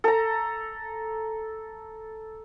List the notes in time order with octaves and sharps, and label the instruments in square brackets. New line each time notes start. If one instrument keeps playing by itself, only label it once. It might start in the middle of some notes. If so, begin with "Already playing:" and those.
[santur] A4 A#5